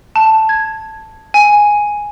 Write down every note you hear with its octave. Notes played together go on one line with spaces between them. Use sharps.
A5
G#6
G#5